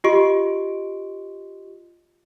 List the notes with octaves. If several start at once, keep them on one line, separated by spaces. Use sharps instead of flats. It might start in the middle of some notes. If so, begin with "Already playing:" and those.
F4 G4 D#5 C6 C#6 D7